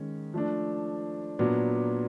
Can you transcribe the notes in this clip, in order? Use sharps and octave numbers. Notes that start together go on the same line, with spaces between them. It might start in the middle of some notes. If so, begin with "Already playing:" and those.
Already playing: D#3 G#3 C#4
F3 A3 D4
A#2 F#3 B3 D4